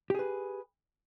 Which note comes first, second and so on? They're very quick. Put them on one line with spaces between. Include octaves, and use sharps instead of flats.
G4 G#4 B4